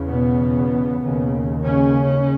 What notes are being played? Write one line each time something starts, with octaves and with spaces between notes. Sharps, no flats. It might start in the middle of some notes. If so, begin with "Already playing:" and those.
Already playing: E2 C#3
B2 B3
D#2 C#3
C#3 C#4